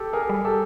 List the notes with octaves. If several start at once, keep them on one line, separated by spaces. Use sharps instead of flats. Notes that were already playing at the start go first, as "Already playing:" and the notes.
Already playing: G4 A4
G#4 A#4
G3
G4 A4